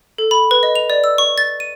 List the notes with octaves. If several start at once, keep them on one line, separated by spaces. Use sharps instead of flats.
A4
B5
B4
D#5
F7
D5
E6
C#6
A6
D#7